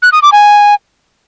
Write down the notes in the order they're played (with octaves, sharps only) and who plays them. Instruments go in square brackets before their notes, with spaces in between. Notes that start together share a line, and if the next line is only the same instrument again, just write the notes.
[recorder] F#6
D#6
D6
G#5